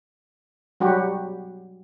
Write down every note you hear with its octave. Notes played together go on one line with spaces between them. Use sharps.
F#3 G3 F#4 G4